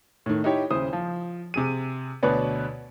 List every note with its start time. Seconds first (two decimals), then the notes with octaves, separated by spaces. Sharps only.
0.26 A2 D#3
0.44 D#4 E4 G4 C#5
0.70 D#1 C#3 E4 C5 D#6
0.93 F3
1.54 C3 G#4 D#7
2.23 D2 B2 B4 C#5 D5